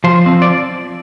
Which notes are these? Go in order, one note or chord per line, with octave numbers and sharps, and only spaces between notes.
F3 C5
C4
D5